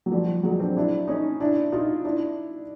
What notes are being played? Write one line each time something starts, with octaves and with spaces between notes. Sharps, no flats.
F#3
F3 G3
F#3 G#3
C4 D4
D4 E4
C#4 D#4
D4 E4
D#4 F4
D4 E4